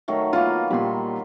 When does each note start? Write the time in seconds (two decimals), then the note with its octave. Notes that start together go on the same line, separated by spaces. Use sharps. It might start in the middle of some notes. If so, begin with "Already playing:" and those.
0.08 D#3 F#3 A3
0.33 A#3 B3 F4
0.71 A#2 G3 B5 C6